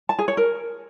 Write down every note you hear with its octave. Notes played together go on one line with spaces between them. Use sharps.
A5
G#4
C#5
A#4